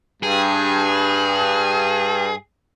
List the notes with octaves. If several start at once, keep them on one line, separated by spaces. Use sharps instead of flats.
G2 G#4